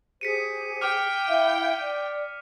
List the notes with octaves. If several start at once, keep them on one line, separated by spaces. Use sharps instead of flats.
G4 G#4 C5 B6 C#7 D#7
G5 D6 F6
E4 E5 F5
D5